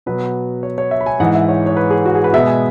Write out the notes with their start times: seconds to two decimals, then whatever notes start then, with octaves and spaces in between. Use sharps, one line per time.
0.06 B2 F#3 B3 B4
0.63 C#5
0.78 C#5
0.91 E5
1.01 B5
1.06 G#5
1.20 G#2 E3 G#3 F#5
1.35 E5
1.48 C#5
1.66 C#5
1.77 B4
1.90 G#4
2.06 F#4
2.15 G#4
2.24 B4
2.33 B2 G#3 B3 E5
2.47 G#5